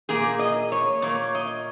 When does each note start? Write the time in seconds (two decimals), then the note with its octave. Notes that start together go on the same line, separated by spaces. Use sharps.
0.09 A#2 A#3 G#4
0.39 D#5
0.72 C#5
1.02 A#2 A#3 C#5
1.35 D#5